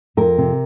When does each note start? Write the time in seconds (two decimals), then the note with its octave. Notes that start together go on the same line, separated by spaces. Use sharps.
0.17 F2 A#4
0.38 C3